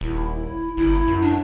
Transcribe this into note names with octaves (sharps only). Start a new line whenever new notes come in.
D#1 E4
G1 E4
F#2
D4